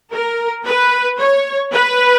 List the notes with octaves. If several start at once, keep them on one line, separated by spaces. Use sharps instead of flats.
A#4
B4
C#5
B4